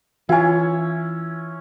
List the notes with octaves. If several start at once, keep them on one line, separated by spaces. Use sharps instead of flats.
E3 C#4 E4 F4 G5 G#5